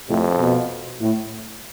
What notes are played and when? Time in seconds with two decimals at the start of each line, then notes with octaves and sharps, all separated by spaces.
0.08 F2 A2 C3
0.40 B2
1.01 A2